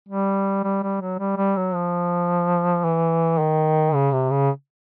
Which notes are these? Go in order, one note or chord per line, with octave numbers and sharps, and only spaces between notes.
G3
G3
G3
F#3
G3
G3
F#3
F3
E3
D#3
C#3
C3
C#3